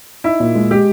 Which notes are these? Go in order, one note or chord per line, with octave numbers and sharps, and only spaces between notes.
D#4 E4
A#2
G#3
G#3 G4